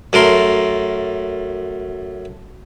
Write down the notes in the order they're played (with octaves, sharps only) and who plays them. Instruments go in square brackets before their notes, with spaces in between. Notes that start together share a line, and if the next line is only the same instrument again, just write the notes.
[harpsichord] F#2 A3 A#4 C6